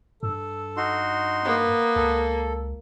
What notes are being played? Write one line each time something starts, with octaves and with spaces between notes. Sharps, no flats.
G2 A4
D#4 F#4 C6
A#3 B3
C#2 A4